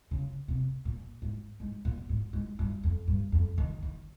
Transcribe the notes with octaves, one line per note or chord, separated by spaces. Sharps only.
C#3
C3
A#2
G#2
G#2
A#2
G#2
G#2
G2
F2
G2
F2
D#3
D#3